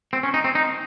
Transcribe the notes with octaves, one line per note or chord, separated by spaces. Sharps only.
C4
C#4
D#4
C4
D#4